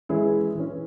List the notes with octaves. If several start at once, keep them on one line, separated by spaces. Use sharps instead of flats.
E3 G#3 C#4 E4 G#4
E3 C#4